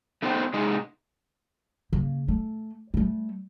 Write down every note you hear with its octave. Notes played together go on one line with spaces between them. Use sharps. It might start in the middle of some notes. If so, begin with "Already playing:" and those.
A3 B3 D#4 C5 F5 G5
C3 G#3 D#4 G#4
C#3 A#3
A3
G3 A3